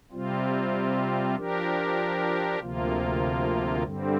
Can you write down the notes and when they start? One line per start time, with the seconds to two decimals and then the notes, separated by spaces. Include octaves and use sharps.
0.12 C3 G3 C4 F4
1.36 F3 D4 G4 A#4
2.60 D2 C3 F3 A#3 F4
3.83 G2 D3 G3 C4